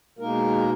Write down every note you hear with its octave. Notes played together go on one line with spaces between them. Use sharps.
B2 G#3 A#3 D#4 A#4